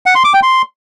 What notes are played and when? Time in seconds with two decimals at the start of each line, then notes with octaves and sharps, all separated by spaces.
0.06 F#5
0.15 C6
0.24 D6
0.34 G5
0.43 C6